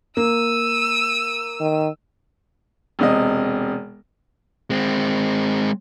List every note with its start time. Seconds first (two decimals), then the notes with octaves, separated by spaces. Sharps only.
0.17 A#3 E6 D#7
1.60 D#3
2.99 E1 C3 D#5
4.70 G#3 C4